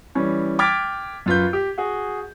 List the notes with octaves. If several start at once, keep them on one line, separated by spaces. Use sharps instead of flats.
E3 G3 C#4
G5 D6 F6 G#6 A6 B6
F#2 F4 B4 G6
G4
F#4 G#4